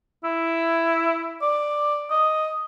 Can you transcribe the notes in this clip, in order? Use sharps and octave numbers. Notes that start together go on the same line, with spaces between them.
E4
D5
D#5